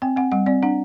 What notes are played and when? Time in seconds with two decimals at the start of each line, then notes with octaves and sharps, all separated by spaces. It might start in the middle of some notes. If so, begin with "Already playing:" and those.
0.02 C4 G5
0.16 C4 F#5
0.32 G3 F#5
0.46 C4 D5
0.62 D4 F#5